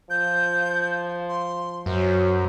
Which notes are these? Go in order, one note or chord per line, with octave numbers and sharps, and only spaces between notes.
F3 G6
C6
F#2 F#3 C5